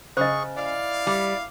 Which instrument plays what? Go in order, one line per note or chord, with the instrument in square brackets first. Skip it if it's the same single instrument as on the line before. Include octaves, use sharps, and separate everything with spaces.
[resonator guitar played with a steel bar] C#3 [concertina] G#4 C#6 [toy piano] C5 D#5
[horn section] E4 F5 [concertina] D5
[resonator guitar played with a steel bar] G3